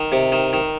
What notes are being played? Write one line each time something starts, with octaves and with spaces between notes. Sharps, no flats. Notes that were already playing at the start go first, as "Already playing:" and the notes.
Already playing: D#3
C3
D#3
D#3